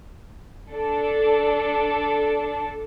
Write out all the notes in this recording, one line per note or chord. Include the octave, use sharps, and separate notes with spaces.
D4 A4